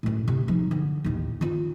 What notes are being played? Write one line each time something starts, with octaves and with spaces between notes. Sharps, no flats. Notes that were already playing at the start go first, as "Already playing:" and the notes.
F#2 A2
C3
F3 D#4
D3
A1 D#2
D#3 F4